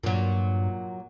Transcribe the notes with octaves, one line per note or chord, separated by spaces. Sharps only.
G2 A#2 F#3